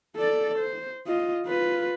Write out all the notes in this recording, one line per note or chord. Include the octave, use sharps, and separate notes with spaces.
A4 D5
C5
F4 D#5
F4 B4